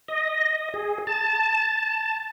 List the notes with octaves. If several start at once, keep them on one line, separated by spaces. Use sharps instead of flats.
D#5
G#4
A5